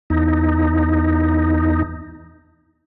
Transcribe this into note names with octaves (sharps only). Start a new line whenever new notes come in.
E2 D#4